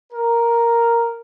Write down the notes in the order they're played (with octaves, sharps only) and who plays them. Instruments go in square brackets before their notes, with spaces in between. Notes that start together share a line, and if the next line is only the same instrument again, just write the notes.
[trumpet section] A#4